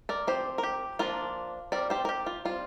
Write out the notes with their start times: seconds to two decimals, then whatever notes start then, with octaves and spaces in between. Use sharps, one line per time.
0.09 A#4 D5
0.27 F3 C4 G4 C5
0.58 A#4
0.63 G4
0.99 F3 A#3 D4 F4 A#4
1.72 G3 C4 A#4 D5
1.90 G4 C5
2.05 A#4
2.09 G4
2.26 F4
2.45 G3 C4 F4